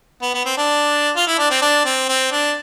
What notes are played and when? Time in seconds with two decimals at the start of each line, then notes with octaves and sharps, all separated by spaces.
0.22 B3
0.34 B3
0.45 C4
0.57 D4
1.16 F4
1.27 E4
1.38 D4
1.51 C4
1.62 D4
1.85 C4
2.09 C4
2.32 D4